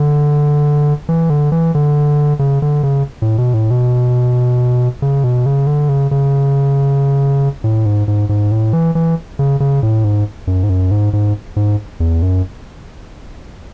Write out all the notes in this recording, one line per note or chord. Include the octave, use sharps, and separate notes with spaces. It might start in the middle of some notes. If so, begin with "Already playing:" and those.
Already playing: D3
E3
D3
E3
D3
C#3
D3
C#3
A2
B2
A2
B2
C#3
B2
C#3
D3
C#3
C#3
A2
G#2
G#2
G#2
A2
E3
E3
C#3
C#3
A2
G#2
F#2
G#2
F#2
G#2
G#2
G#2
E2
F#2